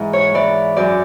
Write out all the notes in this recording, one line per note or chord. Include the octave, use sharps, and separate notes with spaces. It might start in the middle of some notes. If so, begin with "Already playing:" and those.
Already playing: G#2 E3
C#5
E3 D5
F#2 D5